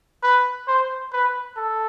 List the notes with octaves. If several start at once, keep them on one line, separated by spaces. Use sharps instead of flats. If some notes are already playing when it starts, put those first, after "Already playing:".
B4
C5
B4
A4